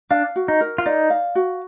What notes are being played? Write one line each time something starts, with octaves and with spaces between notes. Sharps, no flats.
D4 F5
F#4
D#4
A#4
F4
D#4 D5
F5
F#4